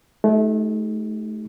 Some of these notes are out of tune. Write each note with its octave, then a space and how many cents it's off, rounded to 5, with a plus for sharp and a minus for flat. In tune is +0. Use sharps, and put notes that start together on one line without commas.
A3 -30 D#4 +20 G4 +0